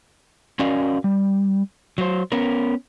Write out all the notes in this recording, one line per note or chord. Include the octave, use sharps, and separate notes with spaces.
C#4 F#4 A#4 D5 D#5 F5
G3
F#3 C5
B3 C#4 A#4